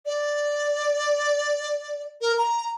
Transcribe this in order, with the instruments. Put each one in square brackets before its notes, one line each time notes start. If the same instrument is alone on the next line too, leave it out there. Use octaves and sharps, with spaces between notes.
[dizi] D5
A#4
A#5